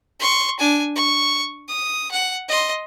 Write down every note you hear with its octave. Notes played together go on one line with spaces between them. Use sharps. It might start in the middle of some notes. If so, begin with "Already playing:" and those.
C6 C#6
D4 G#5
C#6
D#6
F#5
D#5 C6